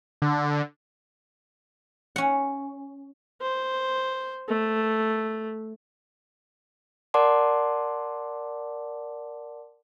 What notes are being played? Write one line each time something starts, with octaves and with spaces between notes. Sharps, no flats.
D3
C#4 F#5
C5
A3
A#4 D5 F#5 A5 C6 D6